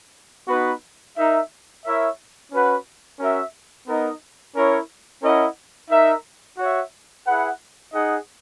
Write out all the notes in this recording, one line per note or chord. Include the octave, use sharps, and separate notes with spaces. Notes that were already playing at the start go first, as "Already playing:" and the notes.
B3 D#4 F#4 B4
D#4 A#4 E5
E4 A#4 C#5 E5
C#4 F#4 B4 F#5
C#4 F#4 A#4 E5
B3 D#4 A#4 D#5
C#4 E4 A#4 C#5
C#4 E4 A#4 D#5 F#5
D#4 A#4 E5
F#4 C#5 E5
E4 G#4 B4 F#5
D#4 G#4 D#5 F#5